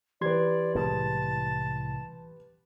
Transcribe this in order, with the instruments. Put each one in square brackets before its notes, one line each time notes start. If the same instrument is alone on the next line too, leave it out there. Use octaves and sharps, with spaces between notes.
[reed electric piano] E3 C6 G#6 [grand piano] G4 B4 [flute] D5
[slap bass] C2 A2 G#3 [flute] A5